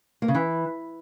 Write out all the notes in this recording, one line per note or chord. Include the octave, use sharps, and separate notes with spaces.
A#3
C#3
E3